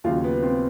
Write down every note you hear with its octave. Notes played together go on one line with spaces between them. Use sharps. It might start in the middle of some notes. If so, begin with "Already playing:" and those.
D#2 C#3 F#3 F4
B3
C4